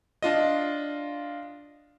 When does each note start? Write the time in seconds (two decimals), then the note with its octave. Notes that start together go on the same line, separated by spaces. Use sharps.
0.22 D4 F4 D#5